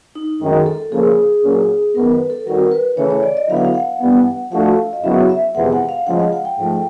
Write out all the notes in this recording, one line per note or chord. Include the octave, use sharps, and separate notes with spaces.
D#4
F#2 D#3 G#3
A4
C#3 F3 A#3 G#4
A#2 F#3 A#3 C#4
F#2 D#3 G#3 B3 A#4
B4
A4
D#3 G3 C4 D#4 F#4 A#4
B4
C#3 E3 A3 C#5
C#5
D5
D#5
D3 F#3 B3 E4 F5
F#5
F5
F#5
G2 E3 G3 B3
F3 A3 D4 F#4 A4 F5
D#5
F#2 C#3 F#3 B3 E4 E5
E5
F2 C3 E3 G#3 B3 F#5
F#5
F5
C#3 F3 G#3 F#5
F5
F#5
G5
G#2 F3 A3